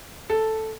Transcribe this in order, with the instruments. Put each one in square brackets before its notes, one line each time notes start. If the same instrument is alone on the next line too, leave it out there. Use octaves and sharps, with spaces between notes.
[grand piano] A4